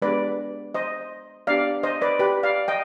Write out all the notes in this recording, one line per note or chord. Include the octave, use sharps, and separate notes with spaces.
G#3 B3 D4 G4 B4 D5
C5 D#5
B3 D4 G4 D5 F5
C5 D#5
B4 D5
G4 B4
D5 F5
D#5 G5